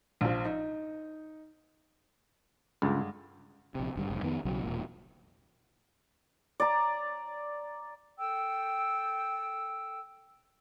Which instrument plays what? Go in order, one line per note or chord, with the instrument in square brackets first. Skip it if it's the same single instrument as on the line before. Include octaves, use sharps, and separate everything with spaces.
[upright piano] A#1 F3
D#4
[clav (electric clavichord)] C#2 [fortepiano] G2 D3 G#3
[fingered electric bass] A#1 C3
G#1 G2 D3
F1 G#2
F2 D#3 B3
B1 C#3 F#3
E1 C2 A#2
[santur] D5 A#5
[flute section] A4 G5 E6